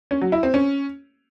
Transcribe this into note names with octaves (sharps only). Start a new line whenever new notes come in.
C#4
F#3
E4
C4
C#4